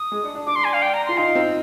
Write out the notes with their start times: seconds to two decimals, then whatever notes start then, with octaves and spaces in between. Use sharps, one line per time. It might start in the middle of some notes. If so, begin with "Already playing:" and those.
Already playing: D#6
0.12 G#3
0.24 D4
0.35 D4
0.46 D4 D6
0.56 C6
0.64 G#5
0.73 F5
0.82 G5
0.94 A#5
1.06 F4 C6
1.17 D#4 F5
1.35 C4